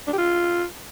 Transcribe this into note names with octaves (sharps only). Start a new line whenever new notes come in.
D4
G4
F4